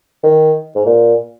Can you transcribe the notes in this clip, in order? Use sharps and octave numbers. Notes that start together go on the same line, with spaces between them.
D#3
G#2
A#2